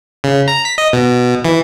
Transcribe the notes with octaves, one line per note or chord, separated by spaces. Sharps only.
C#3
A#5
B6
D#5
B2
E3